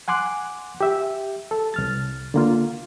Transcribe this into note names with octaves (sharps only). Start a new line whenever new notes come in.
F#5 G#5 C6 D6 F#6
G4 E5
A4
C2 F6 A6
D3 A#3 F4